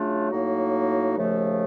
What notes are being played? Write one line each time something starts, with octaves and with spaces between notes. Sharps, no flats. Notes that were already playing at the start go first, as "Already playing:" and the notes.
Already playing: C#3 F#3 A3 D4 F4
A2 F#3 A#3 D#4 F#4
D#2 C#3 F3 A3